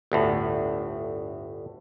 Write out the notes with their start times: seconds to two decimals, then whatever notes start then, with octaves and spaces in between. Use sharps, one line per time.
0.12 G1 D2 A2